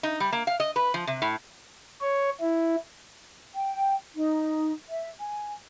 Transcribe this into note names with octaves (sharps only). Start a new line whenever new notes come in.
D#4
G3
A#3
F5
D#5
B4
F3
C3
A2
C#5
E4
G5
D#4
E5
G#5